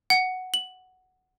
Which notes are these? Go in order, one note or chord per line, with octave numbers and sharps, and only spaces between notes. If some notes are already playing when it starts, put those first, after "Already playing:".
F#5
F#7